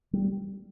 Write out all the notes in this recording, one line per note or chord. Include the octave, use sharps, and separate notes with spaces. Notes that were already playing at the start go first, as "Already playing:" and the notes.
G3